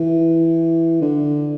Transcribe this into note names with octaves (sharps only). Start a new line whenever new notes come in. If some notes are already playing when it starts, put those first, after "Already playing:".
Already playing: E3
D3